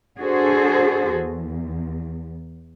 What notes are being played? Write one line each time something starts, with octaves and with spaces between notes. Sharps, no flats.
D4 F#4 G#4 A4 C5
E2